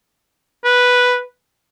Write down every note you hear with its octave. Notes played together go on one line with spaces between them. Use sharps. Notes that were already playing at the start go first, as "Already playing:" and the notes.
B4